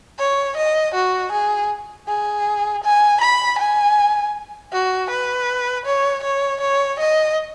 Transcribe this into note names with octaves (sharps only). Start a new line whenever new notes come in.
C#5
D#5
F#4
G#4
G#4
G#5
B5
G#5
F#4
B4
C#5
C#5
C#5
D#5